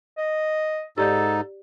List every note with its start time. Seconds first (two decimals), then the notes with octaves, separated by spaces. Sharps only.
0.18 D#5
0.98 G#2 D#4 G4 A4 D5 G6